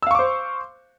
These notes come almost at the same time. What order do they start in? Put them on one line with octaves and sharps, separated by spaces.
E6 F5 C#6 D6 C5